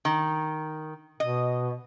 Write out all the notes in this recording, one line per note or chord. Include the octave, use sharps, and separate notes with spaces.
D#3
B2 D#5